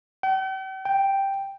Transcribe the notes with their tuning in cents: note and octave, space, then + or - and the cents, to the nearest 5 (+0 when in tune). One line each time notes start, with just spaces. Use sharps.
G5 -45
G5 +0